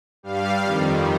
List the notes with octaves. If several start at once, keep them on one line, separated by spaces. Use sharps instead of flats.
G2 G3 F5
F2 D#3 G3